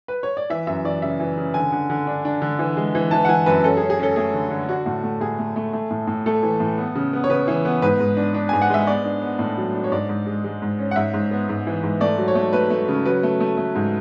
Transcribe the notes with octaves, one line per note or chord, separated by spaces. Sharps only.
B4
C#5
D5
E3 E5
F#2 E5
E3 D5
C#3 E5
E3
C#3
D3 G#5
D3
D3
D4
D4
D3
E3
G#3
E3
E3 A5
F#5
E3 G#5
F#2 B4
C#4 A4
G#4
C#4
G#4
C#4 A4
A3 G#4
D3
D3
D4 F#4
A2
A3
A2 G#4
A3
A3
A3
A2
A2
A3 A4
E3
A2
B3
C#3
B3
C#5
C#3 B4
E3
B3
G#2 B4
G#2
D4
D4
G#2 G#5
F#5
G#3 E5
B3 D5
D4
B3
A2
F#3
D4
C#5
G#2 D5
G#2
G#3
G#3
G#2
C#4
F#5
G#2 E5
G#2
B3
G#2
E3
G#2
A3 D5
F#3
C#5
A3
A3 B4
A3
C#3
F#3 B4
A3
A3
A3
G#2